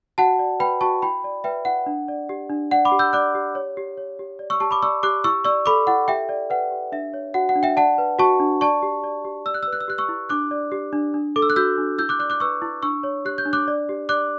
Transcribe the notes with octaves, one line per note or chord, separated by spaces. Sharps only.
F#4 F#5 A5
D5
B4 G5 B5
F#4 A5 C#6
E4 G5 B5
D5
B4 E5 G5
E4 F#5
D4
D5
G4
D4
D5 F#5
B5 D6
G4
E6 G6
D5 D6 F#6
G4
C#5
G4
C#5
G4
D5
C#6 E6
G4 A5 C#6
B5 D6
D5 C#6 E6
G4 D6 F#6
E4 C#6 E6
D5 C#6 E6
A4 B5 D6
E4 F#5
G4 E5 G5
D5
B4 F#5
G4
D4 E5
C#5
F#4 F#5
F#5
D4
E5 G5
D5 F#5 A5
B4
F#4 A5 C#6
D4
D5 A5 C#6
G4
D5
G4
D5 E6
F#6
E6
B4
F#6
E6
G4 F#6
C#6 E6
E4
D4 D6 F#6
D5
G4
D4
D4
A4 D6
E6
F#6
F#4 E6 G6
D4
E4 E6 G6
D6 F#6
D5 D6 F#6
D6 F#6
B4 C#6 E6
E4
D4 C#6 E6
C#5
G4 F#6
G6
D4
D6 F#6
D5
G4
D5 D6 F#6